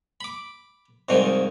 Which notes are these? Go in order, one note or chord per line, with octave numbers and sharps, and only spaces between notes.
B5 D6
C2 G#2 D#3 F3